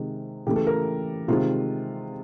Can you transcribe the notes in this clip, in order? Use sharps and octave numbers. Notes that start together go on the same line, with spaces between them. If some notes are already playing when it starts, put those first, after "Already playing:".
Already playing: C3 D#3 G#3
C#3 E3 A3 G4
A4
A#4
C3 D#3 G#3 F4